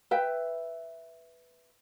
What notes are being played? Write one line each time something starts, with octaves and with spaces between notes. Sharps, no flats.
B4 E5 G5